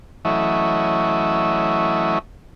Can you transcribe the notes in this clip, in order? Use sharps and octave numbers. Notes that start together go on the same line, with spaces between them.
E3 F#3 A3 C#4 E4 D#5